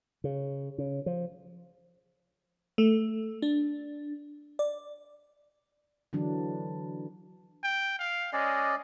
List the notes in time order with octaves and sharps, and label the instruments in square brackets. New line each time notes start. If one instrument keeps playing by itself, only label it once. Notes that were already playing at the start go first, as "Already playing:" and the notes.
[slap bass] C#3
C#3
F3
[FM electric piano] A3
D4
D5
[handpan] D3 E3 F#3 D4
[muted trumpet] G5
F5
[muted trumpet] G#3 [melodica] C#4 D5 D#5